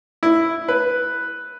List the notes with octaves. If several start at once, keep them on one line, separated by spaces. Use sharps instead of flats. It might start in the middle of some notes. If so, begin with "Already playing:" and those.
E4
B4